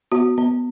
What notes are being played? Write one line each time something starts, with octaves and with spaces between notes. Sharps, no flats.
B3 F#4
B3